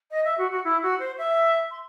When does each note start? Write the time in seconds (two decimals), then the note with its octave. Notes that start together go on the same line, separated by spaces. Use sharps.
0.11 D#5
0.24 E5
0.38 F#4
0.51 F#4
0.64 E4
0.82 F#4
0.99 C5
1.18 E5
1.71 C6